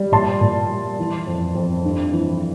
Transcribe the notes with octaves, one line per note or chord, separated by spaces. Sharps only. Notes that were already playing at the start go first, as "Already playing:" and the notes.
Already playing: G3
A#2 A5 C6
A#2
G3
E3
F2
F2
G2
E3